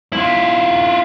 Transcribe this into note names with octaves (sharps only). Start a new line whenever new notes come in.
E4 F4